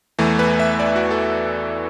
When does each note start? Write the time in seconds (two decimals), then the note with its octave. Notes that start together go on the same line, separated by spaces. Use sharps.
0.19 E2 E3 A3
0.39 B4
0.60 E5
0.80 D5
0.96 F#4
1.11 A4